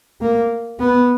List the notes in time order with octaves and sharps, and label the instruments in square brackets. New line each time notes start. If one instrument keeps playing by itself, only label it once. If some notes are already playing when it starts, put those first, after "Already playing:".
[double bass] A#3
B3